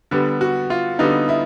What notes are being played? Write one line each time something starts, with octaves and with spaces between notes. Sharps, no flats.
D3 G3 B3
F#4
F4
D3 G3 B3 D#4
E4